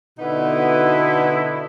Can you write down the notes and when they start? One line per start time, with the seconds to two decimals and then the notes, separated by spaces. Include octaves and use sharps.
0.19 B2 D3 B3 D#4 E4 F#4